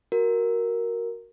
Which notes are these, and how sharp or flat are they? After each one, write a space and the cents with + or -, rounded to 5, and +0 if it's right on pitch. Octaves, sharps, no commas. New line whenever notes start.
F#4 +0 A#4 +0